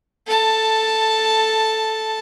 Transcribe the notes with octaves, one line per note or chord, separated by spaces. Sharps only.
A4 A5